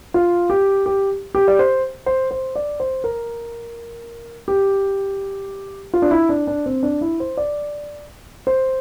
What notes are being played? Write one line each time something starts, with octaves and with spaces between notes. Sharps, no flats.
F4
G4
G4
G4
D5
C5
C5
C5
D5
C5
A#4
G4
F4
D4
E4
D4
D4
C4
D4
E4
C5
D5
C5